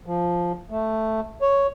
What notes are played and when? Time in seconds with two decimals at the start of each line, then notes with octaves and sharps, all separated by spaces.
0.06 F3
0.70 A3
1.42 C#5